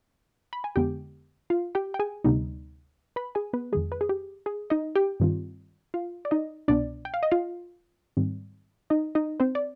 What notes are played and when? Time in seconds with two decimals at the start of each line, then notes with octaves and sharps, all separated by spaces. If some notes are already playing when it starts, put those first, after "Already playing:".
0.53 B5
0.64 G#5
0.76 F2 D3 G#3 B3 G4 G5
1.50 F4 F5
1.75 G4 G5
1.94 G5
1.99 G#4 G#5
2.24 D2 C3 G3 B3 D#4
3.16 B4 B5
3.35 G#4 G#5
3.53 B3 B4
3.72 F2 D#3 G#3 G#4
3.92 B4
4.01 G#4
4.09 G4
4.46 G#4
4.70 D#4 D#5
4.95 G4 G5
5.20 G2 D#3 G3 C4 F4
5.94 F4 F5
6.25 D5
6.31 D#4 D#5
6.68 C2 B2 B3 D4 D5
7.05 G5
7.14 F5
7.23 D#5
7.31 F4 F5
8.17 G#2 D#3 G3 C4
8.90 D#4 D#5
9.15 D#4 D#5
9.40 C4 C5
9.55 D5